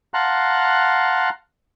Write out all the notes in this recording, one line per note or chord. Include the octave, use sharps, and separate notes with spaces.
F5 F#5 A5 A#5 C6 F#6